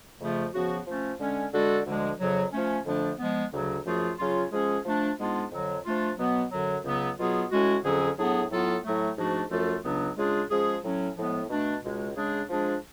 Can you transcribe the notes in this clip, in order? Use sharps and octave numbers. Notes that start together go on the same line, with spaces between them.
F2 C#3 F3 A3 F4
C#3 F3 B3 F#4
F3 A3 C#4
D3 G#3 C#4
D3 G#3 D4 F#4 A4
D2 D3 F3 G#3 D4
F2 C#3 F#3
F3 A3 C#4
F2 D3 F3 A3 D4
F3 G#3 B3
D2 C#3 F#3
F#2 F3 A3 F4 G#4
C#3 F#3 C#4 F4
F3 G#3 C#4 G#4
F3 A3 D4
G#2 G#3 B3 D4 F4
F2 D3 F#3
F3 A3 D4 F4
B2 F#3 B3
F#2 D3 F#3
C#2 C#3 F#3 B3
B2 F#3 B3 F4 G#4
A2 G#3 C#4 F#4
F2 D3 F#3 C#4 G#4
A2 F#3 B3 D4 G#4
A2 F#3 B3 F4 A4
A2 F#3 A3
G#2 F3 A3 D4 F#4
F#2 F3 A3 F4 A4
C#2 C#3 F#3 B3 D4
C#3 G#3 D4 F4 G#4
F3 G#3 C#4 G#4
A2 F#3 C#4
A2 F3 G#3 B3
B2 A3 D4
C#2 B2 G#3
C#3 G#3 D4 G#4
F3 G#3 D4 G#4